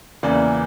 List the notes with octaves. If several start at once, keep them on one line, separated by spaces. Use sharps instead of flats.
E2 C#3 E3 A#3 D5